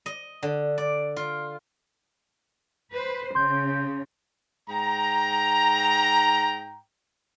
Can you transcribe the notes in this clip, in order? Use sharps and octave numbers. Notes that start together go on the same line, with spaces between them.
D#5
D3
D5
F4
B4 C5
C#3 C6 G6
G#2 G5 A#5